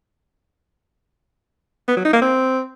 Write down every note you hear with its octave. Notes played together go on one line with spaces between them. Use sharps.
B3
F#3
D#4
A#3
C4